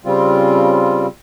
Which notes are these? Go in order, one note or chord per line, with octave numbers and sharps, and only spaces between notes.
C#3 G3 C4 F4